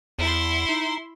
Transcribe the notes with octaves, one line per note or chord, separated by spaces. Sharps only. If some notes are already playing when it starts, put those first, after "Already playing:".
E2 E4 C6
D#4